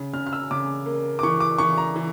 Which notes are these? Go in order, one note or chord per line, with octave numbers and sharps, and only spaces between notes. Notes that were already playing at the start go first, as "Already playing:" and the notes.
Already playing: C#3
C#3 F6
F6
E6
C#3 D6
A#3
D6
E3 C#6
D6
E3 C#6
A#5
E3